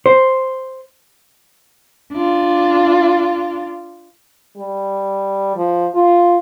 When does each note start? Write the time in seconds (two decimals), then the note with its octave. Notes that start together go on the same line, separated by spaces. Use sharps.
0.06 C5
2.13 D4 F4
4.57 G3
5.56 F3
5.95 F4